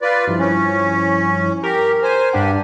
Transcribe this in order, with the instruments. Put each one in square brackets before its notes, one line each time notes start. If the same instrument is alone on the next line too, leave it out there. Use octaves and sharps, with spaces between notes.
[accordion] F4 B4 D5
[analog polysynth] G2 F3 E4
[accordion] C#4
[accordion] G4 [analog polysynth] A#4
[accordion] C5 G#5
[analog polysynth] G2 D4 F#5 [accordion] G4